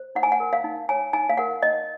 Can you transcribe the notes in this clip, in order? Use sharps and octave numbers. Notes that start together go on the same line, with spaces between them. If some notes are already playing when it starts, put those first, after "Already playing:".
Already playing: C5
D#4 F#5
G#5
F#5
A#4
F5
D#4
C#5 G#5
D#4 G#5
F5
A#4 F#5
D#4 D#5